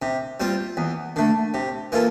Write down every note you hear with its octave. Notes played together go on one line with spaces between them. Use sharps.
C3
G3 C4 F4
E2
D3 A3
C3
E3 A#3 F4 A4